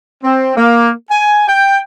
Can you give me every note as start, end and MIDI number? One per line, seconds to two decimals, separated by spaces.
0.24 0.54 60
0.56 0.90 58
1.10 1.44 80
1.48 1.78 79